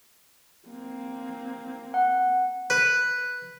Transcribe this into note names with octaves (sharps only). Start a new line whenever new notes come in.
A#3 C4
F#5
B4